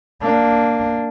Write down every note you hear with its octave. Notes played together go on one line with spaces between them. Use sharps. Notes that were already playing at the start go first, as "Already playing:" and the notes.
A#3 D4